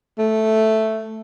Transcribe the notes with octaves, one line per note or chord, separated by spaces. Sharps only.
A3